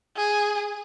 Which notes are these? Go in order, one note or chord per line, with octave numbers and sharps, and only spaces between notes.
G#4